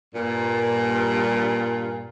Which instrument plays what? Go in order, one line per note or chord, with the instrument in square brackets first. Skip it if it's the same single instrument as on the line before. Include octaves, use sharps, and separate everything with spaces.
[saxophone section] G2 A#2